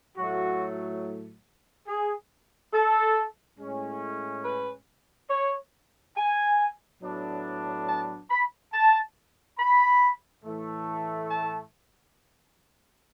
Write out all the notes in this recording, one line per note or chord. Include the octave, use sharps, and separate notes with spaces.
A2 F#3 A3 F#4
G#4
A4
A2 G#3 C#4
B4
C#5
G#5
A2 F#3 B3 D4
A5
B5
A5
B5
A2 E3 A3
A5